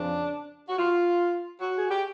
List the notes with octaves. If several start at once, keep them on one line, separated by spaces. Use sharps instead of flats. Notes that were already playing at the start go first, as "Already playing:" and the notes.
Already playing: F2 C#3 F3 D4
F#4
F4
F#4
G#4
G4